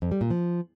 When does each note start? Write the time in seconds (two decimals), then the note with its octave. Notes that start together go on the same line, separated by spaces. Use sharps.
0.02 F2
0.12 G3
0.21 A#2
0.31 F3